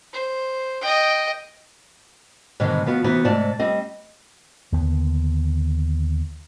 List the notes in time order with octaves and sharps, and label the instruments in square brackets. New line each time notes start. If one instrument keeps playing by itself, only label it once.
[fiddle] C5
D#5 G5
[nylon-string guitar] G#2 B2 D3 D#3 G3 G#3
F3 B3 F#4
C3 E3 B3 D#4 E4 F#4
G#2 C3 A3 D5 A5
G3 C4 D#5
[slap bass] D#2 D3 B3